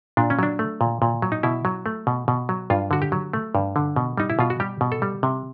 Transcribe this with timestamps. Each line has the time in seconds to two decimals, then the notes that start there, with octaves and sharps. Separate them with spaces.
0.17 A#2 D4
0.30 C#4
0.39 F#3 D4
0.59 A3
0.81 A#2
1.02 A#2
1.22 F#3
1.32 D#4
1.43 B2 E4
1.65 F#3
1.86 A3
2.07 B2
2.28 B2
2.49 F#3
2.70 G2 F4
2.91 D3 F#4
3.02 G4
3.12 F#3
3.33 A3
3.55 G2
3.76 D3
3.96 B2
4.17 G3 D#4
4.30 E4
4.39 B2 F4
4.50 F#4
4.60 G3 G4
4.81 B2
4.92 A4
5.02 G3
5.23 C3